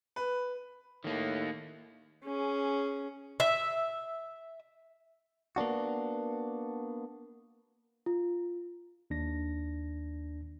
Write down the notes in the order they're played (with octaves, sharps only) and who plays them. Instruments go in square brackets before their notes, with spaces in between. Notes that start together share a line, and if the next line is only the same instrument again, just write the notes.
[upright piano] B4
[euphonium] A2 [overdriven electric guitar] D#3 A#3
[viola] C#4 G#4
[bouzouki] E5
[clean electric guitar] A#3 B3 D4 F#4
[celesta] F4
[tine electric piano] D#2 D4 A#6